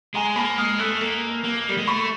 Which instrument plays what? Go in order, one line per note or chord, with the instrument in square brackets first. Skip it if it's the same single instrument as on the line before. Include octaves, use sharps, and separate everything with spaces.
[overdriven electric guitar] G#3 [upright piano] G#5 A#5
[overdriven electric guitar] A#3 [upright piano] A5 B5
[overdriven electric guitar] G#3 [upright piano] D#6 F6
[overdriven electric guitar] A3 [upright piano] E6 F#6
[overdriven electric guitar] A#3
A#3
G3
G#3
[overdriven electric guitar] A3 [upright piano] B5 C#6